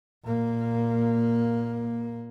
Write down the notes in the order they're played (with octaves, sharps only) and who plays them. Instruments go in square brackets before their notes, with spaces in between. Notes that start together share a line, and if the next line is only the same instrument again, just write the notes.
[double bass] A#2 A#3